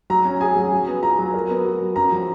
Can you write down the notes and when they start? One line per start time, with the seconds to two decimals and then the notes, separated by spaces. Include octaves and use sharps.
0.10 F#3 A#5
0.25 C#4
0.41 G#4 G#5
0.56 F#3
0.72 F#3
0.87 B3
1.03 F4 A#5
1.19 F#3
1.34 A#4
1.50 B3
1.65 F#4
1.81 F#3
1.96 F#2 A#5
2.12 F3